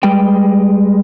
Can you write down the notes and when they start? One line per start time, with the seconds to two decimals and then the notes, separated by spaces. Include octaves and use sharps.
0.03 G3 G#3 B4 G5